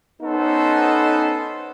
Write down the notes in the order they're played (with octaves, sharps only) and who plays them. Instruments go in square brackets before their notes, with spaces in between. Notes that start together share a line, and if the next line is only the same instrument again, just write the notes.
[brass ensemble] B3 C#4 D#4 A4 C5